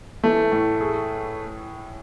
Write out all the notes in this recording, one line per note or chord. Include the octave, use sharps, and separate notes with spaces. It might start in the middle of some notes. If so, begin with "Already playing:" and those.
E3 A3
A2
G#4